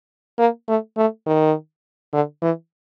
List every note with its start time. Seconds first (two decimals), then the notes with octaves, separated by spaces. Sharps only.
0.39 A#3
0.68 A3
0.97 A3
1.26 D#3
2.13 D3
2.42 E3